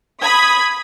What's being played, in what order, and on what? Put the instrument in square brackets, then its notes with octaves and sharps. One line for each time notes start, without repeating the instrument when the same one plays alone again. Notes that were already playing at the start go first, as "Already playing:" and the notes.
[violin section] B5 D#6 G#6 B6